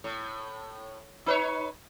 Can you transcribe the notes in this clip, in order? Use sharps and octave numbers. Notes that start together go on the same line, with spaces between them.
A2
D#4 B4 C#5